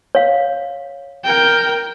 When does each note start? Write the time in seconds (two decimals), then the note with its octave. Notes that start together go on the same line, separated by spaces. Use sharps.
0.15 C#5 F5
1.25 A#4 G5